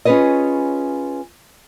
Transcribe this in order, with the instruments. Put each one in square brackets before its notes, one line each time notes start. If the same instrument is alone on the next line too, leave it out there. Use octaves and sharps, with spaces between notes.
[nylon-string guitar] C#4 F4 G#4 B4 C#5 D#5